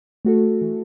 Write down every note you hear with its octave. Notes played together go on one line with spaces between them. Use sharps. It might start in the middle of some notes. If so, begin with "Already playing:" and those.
A3 F#4 A4
E3